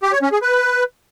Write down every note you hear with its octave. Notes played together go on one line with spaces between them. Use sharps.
G4
C#5
C#4
G#4
B4